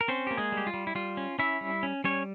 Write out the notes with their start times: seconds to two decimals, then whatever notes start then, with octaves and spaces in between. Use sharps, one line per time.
0.01 A#4
0.08 C4 C#4 C5
0.27 A#3 G4
0.37 G#3 G#4
0.52 G3
0.57 G4
0.67 F4
0.74 G3
0.87 E4
0.95 G3 F4
1.17 C#4
1.39 C#4 E4 E5
1.61 G3
1.83 C#4
2.04 G3 C#4 C#5